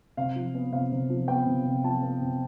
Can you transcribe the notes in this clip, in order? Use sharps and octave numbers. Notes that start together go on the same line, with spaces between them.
C3 F5
F3
B3
C3 F5
C3
F3
B3 G5
C3
C3
F3 A5
B3
C3